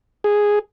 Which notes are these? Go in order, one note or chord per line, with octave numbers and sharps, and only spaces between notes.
G#4